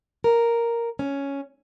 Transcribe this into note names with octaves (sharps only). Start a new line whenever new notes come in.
A#4
C#4